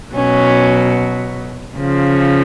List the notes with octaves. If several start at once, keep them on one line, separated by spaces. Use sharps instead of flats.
B2 F#3 C#4
C#3 F3